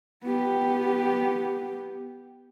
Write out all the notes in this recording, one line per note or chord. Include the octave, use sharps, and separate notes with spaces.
B3 G4